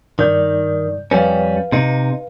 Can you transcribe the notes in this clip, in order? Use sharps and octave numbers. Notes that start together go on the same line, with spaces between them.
G2 D#3 D5 G6
F2 G3 C#4 B4 F5
C3 D#4